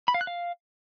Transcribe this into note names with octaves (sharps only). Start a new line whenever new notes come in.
B5
F5
F#6
F5